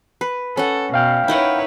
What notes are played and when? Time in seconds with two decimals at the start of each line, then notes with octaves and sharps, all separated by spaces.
0.21 B4
0.57 C#4 A4 F#5
0.94 B2 F5 G5 F6
1.28 D#4 E4 A#4 B4 C#5 F#5